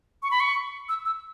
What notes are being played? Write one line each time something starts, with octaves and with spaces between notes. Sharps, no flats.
C#6
B5
C#6
E6
E6